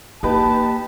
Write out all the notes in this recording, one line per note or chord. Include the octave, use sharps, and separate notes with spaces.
A#3 D#4 G4 B4 A5